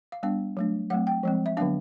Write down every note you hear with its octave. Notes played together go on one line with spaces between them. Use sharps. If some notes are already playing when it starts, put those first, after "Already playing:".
F5
G3 B3 D4 F5
F#3 A3 D4
F#3 A3 C4 F#5
G5
F3 G#3 C4
E5
D3 F#3 B3 D4 F5